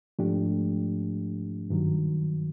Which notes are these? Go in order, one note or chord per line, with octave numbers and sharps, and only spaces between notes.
G#2 F3 A3 D4 G4
G2 D#3 F#3